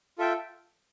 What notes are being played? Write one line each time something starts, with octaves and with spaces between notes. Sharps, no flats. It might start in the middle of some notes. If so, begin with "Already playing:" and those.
F4 A4 E5 G5